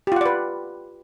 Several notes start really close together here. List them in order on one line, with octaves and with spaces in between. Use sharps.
G4 F4 F#5 D5 B4